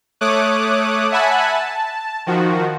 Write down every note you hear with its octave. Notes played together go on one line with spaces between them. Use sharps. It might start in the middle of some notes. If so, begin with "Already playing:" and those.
A3 C#5 D6 D#6 F#6
E5 F#5 G#5 A5 B5 F#6
A5
D#3 F3 F#4